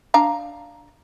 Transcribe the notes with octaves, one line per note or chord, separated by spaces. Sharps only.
D4 F5 A#5